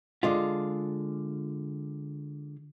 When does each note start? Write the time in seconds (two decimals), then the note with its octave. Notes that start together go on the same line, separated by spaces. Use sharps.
0.23 D3 G#3 F4